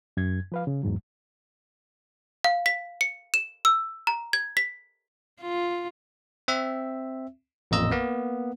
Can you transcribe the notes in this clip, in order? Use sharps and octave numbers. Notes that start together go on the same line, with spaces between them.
F#2 G#6
F3 B4 F5
C#3
E2 G#2 F#3
F5
B6
C#7
E7
E6
A#5
G#6
B6
F4
C4 E5
A1 F2 A#2 D#5 E6
A#3 B3